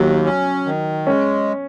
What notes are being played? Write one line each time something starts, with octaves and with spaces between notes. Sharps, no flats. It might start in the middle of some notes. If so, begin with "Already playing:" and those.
Already playing: D#2 F#3
C#4
D#3
G#3 C#4